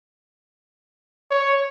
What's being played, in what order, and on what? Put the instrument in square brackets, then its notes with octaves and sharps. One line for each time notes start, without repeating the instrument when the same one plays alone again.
[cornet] C#5